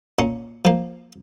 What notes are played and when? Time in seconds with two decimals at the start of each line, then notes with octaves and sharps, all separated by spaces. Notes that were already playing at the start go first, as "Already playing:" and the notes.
0.19 A#2 C#4
0.65 F3 A#3